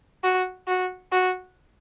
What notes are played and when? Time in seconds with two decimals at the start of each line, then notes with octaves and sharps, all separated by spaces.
0.24 F#4
0.67 F#4
1.12 F#4